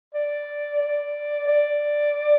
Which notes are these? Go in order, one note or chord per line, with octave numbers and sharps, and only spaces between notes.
D5
D5
D5